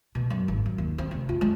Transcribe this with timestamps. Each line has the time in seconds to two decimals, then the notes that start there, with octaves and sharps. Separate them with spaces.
0.15 B2
0.30 F#2
0.48 G#1
0.66 F#2
0.78 D#2
0.98 C4
1.11 F1
1.29 F4
1.41 G#3